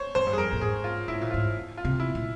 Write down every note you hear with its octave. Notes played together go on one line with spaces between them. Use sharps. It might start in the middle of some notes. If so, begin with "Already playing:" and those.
Already playing: C5 C#5
F2 C5
G2
G#4
F2 A#4
A#2
G#2 G#4
F4
G#2 E4
A#2
G#2 F4
F4
C3
E4
A#2